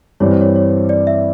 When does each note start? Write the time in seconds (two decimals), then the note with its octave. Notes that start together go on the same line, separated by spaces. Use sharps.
0.20 G2 E3 G3 C4 C#5
0.31 C5
0.41 C#5
0.56 C#5
0.89 D5
1.07 E5